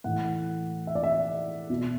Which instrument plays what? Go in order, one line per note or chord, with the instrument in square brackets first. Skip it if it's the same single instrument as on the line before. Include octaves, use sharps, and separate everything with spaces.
[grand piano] A2 E3 F#5
E5
D5
E5
B2